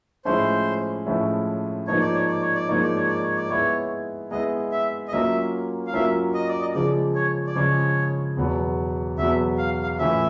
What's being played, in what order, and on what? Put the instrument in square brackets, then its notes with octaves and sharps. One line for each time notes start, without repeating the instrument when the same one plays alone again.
[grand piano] A2 F3 G#3 C#4 E4 [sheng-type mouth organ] C5
[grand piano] A2 F3 G#3 C#4 E4
[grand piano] G#2 F3 A#3 D#4 [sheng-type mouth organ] C#5
[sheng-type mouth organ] D5
C#5
D5
C#5
D5
[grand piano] G#2 F3 A#3 D#4 [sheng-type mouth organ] C#5
[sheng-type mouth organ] D5
C#5
D5
C#5
D5
[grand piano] G#3 B3 E4 [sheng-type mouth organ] C#5
[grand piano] G#3 B3 E4 [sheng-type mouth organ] D#5
[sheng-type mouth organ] E5
D#5
[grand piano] F#3 A#3 C#4 F4 A#4 [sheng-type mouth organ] E5
[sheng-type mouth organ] F5
[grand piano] F#3 A#3 C#4 F4 A#4 [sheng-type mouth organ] E5
[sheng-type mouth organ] D#5
D5
D#5
[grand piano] C#3 F3 G#3 [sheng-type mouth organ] D5
[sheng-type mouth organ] C#5
D5
[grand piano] C#3 F3 G#3 [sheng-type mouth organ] C#5
[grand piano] E2 B2 F#3 B3
[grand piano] E2 B2 F#3 B3 [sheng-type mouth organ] E5
[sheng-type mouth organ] F5
F5
[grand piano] A2 E3 A3 C#4 F4 [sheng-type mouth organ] E5